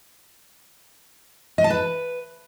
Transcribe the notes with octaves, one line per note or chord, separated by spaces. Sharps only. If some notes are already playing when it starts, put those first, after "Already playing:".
D#5
A5
B4